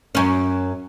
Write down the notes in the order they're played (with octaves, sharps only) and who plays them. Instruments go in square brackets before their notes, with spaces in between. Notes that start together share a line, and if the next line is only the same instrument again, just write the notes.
[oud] F#2 C#4